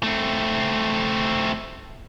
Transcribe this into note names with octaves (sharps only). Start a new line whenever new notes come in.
A3 C4